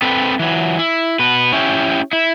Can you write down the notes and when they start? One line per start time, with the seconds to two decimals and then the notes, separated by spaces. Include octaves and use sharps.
0.02 C4 A4 B4
0.39 E3 F#3
0.79 E4
1.19 B2 B4
1.53 C#4 E4 G4
2.13 E4